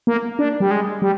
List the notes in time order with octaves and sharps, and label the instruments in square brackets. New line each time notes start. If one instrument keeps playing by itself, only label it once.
[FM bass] A#3
D4
G3
G#3
G3